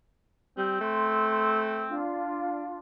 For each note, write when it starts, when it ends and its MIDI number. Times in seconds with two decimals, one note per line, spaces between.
0.58 0.78 55
0.58 1.99 60
0.81 2.02 57
0.81 1.63 84
1.88 2.78 62
1.88 2.78 65